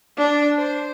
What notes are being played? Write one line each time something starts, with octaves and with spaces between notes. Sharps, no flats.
D4
C5